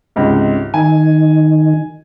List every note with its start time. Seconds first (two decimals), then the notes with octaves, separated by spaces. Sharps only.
0.16 C#2 G#2 C3
0.74 D#3 G#5